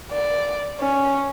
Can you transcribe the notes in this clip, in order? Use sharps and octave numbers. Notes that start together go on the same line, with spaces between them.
D5
C#4